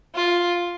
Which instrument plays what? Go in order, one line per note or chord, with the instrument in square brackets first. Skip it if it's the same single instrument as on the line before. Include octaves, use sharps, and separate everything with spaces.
[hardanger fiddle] F4